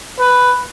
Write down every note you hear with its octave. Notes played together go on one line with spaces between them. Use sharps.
B4